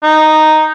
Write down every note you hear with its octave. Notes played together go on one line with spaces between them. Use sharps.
D#4